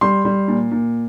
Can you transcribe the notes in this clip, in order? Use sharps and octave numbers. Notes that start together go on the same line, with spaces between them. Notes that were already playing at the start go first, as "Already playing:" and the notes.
G3 C6
G3
A#2
A#2